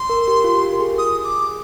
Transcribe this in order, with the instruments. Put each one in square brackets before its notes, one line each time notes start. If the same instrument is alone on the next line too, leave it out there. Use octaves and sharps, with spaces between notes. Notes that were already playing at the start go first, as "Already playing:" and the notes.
Already playing: [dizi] C6
[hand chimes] A#4
G4
F4
G4
A#4
G#4
[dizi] D#6
D6